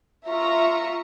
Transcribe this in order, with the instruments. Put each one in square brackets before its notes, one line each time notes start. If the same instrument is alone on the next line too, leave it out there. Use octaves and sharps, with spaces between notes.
[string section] F4 E5 A#5 C#6